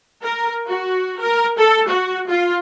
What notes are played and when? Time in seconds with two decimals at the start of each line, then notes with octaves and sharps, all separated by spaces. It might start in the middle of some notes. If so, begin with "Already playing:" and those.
0.22 A#4
0.67 F#4
1.20 A#4
1.57 A4
1.88 F#4
2.29 F4